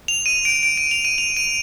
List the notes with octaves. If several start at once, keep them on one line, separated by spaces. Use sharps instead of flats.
F7
D#7
D7
D7
D#7
F7
D#7
F7
D#7